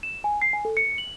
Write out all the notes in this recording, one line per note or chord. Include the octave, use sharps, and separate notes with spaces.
E7
G#5
C7
G#5
A4
C#7
F#7